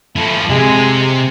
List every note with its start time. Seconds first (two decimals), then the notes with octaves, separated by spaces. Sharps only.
0.17 F3 A3 E4
0.50 C3 G#3